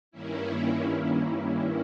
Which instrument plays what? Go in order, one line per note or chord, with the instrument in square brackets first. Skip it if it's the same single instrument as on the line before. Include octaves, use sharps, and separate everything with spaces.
[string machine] G2 D#3 A#3 C#4 E4